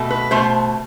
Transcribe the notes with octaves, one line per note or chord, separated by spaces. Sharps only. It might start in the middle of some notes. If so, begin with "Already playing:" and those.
Already playing: B2 A3
B4
B2 A3 C5